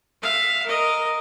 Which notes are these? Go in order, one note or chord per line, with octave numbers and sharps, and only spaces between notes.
E5 F5
A#4 D#5